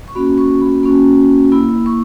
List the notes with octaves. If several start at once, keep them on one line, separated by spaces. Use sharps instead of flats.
C#6
A#3 C#4 F#4 B5
C#6
B5
A#3 C#4 F#4
A#3 E4 B5
C#6